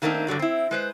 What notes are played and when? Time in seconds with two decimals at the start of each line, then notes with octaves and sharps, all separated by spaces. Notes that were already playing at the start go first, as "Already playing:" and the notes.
0.02 D#3 A3 A#3 C4 D4 D#4
0.27 G2 D3 F#3 D5
0.39 C4 E4
0.71 G#3 B4 C5